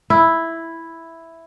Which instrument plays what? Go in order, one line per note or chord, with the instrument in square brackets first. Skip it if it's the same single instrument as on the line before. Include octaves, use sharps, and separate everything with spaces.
[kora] E4